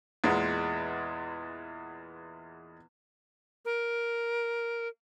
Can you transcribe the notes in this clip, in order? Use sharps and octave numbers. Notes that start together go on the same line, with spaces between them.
E2 A#2 G#3 B3
A#4